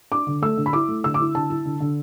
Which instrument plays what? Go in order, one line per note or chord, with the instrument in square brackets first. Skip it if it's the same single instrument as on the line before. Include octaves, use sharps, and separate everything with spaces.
[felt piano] D4 D6
D3
A3 E6
D3
B5
E4 D6
A3
D3 E6
D6
E4
D3 A5
E4
D3
D3